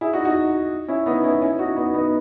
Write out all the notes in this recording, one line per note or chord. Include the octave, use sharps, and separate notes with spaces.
E4 G#4
D#4 F#4
D#4 F#4
C#4 E4
B3 D#4
C#4 E4
C#4 E4
D#4 F#4
B3 D#4
B3 D#4